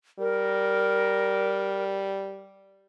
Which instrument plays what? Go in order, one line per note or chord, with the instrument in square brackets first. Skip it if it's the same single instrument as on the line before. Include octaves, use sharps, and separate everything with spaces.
[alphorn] G3 [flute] A#4